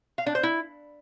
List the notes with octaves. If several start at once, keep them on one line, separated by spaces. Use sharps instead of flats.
F5
D4
C5
E4